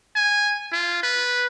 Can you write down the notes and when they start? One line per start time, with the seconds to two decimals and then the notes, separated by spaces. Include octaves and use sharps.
0.16 G#5
0.73 F4
1.03 B4